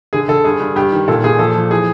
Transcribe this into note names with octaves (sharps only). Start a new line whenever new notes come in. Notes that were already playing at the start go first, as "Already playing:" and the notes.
D3 G#4
D3 A4
G2 G#4
G2
G2 G4
D#3
A#2 A4
A#2 G#4
F3 A4
F3
E3 G#4